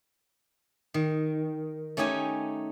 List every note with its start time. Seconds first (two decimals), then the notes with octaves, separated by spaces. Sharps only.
0.94 D#3
1.97 A3 C#4 D#4 G4 G#5